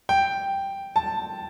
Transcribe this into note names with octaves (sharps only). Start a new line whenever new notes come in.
G5
A5